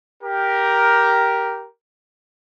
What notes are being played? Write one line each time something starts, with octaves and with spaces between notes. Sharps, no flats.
G4 A#4